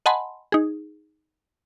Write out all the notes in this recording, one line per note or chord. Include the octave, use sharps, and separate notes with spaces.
D#5 F#5 G#5 A5 B5 C6
D#4 G#4